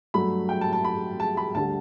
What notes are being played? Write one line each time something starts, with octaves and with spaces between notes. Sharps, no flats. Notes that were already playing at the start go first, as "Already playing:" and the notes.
G2 F#3 A3 B5
G5
A5
A5
B5
A5
B5
D2 D3 G3 A5